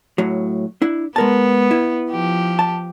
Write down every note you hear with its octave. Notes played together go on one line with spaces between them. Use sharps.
A2 F#3
D4 E4
G#3 B3 A#4 A5
E4
F3 G4
A5